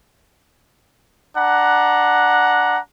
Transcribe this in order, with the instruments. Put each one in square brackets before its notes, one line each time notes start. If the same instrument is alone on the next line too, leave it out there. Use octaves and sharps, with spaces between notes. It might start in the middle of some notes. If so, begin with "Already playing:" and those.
[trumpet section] D4 F#5 A#5